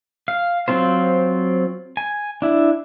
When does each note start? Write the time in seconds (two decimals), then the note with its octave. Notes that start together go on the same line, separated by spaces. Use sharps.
0.28 F5
0.68 F#3 C4 F4 C5
1.97 G#5
2.42 D4 E4